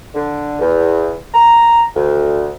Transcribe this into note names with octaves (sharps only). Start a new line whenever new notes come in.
D3
E2
A#5
D2